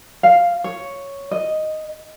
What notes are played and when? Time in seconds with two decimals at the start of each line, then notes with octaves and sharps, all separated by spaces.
0.23 F5
0.64 C#5
1.31 D#5